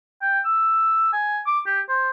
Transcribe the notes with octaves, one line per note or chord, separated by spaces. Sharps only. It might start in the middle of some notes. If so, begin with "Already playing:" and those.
G5
E6
G#5
D6
G4
C5